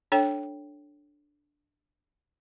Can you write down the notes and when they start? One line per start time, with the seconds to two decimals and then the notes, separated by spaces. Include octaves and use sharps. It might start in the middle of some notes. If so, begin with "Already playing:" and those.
0.12 D4 A4 C#5 G5